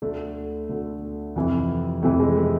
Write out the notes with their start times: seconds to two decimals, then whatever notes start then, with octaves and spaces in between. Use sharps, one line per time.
0.02 D2 D3 A3
0.69 D2 D3
1.36 F2 C3 E3
2.02 F2 C3 E3 A3
2.20 G#3
2.36 A3